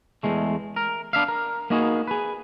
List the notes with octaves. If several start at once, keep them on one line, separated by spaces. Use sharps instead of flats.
E2 G#3 A3
A#4
B3 D4 E5 F5
A#4
A#3 B3 D#4 F#4 G#4
G#4 B4